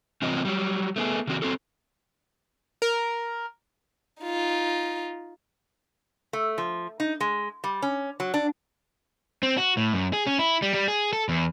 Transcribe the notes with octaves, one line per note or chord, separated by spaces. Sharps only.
C3 E3 F#3 C4 F4 D#5
F#3 G3
A3 B3 G#4
C#3 E3 C4 D#4 F#4
C4 F#4 A4
A#4
D#4 F4
A3
F3
D#4
G#3
G3
C#4
F#3
D4
C4
F#4
A2
F#2
G#4
C#4
E4
G3
G3
G#4
A4
E2